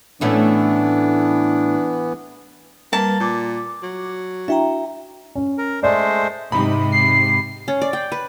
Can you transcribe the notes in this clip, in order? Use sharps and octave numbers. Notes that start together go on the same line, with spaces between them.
A2 E3 A3 B3 C#4 D4
G3 A#3 B4 A5
A#2 D6
F#3
D4 E4 F#4 E5 G5 A#5
C#4
A#4
G#3 A3 C5 D5
G#2 C3 D#4 B5
C7
C#4
D5
G5
B4